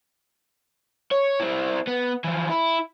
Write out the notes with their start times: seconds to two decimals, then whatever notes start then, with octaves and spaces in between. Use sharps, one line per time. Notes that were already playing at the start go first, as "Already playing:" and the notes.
1.11 C#5
1.40 C4 E4
1.87 B3
2.24 E3 F3
2.49 E4